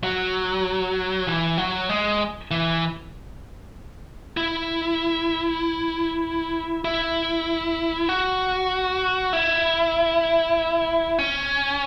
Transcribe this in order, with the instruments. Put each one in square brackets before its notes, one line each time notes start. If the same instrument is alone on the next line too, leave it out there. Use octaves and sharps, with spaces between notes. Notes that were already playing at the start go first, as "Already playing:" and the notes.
[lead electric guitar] F#3
E3
F#3
G#3
E3
E4
E4
F#4
E4
C#4